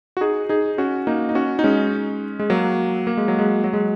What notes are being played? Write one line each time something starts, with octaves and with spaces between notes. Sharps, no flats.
F#4
D#4 G#4
D#4 G#4
C#4 F#4
A#3 D#4
D#4
C#4 F#4
D#4
G#3 C#4
G#3
F#3 A#3
A#3
G#3
F#3
G#3
F#3
G#3